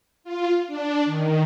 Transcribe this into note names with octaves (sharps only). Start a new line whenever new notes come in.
F4
D4
D#3